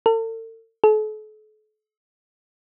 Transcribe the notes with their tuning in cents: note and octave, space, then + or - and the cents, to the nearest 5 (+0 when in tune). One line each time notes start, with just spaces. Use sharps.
A4 +45
A4 -40